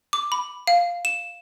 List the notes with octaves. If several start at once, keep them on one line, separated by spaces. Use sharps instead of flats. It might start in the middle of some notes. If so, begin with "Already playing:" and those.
D6
B5
F5
E7